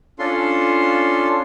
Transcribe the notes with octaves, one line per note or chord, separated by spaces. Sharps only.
C#4 D4 F4 A4 C6